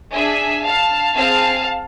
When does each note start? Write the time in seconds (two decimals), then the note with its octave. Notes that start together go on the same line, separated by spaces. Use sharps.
0.12 D4 G#4 E5 G#5
0.64 F5 A5
1.16 C4 G#4 F5 A5